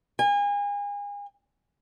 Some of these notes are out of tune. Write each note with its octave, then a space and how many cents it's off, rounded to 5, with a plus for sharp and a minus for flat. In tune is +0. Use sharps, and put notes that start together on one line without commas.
G#5 -35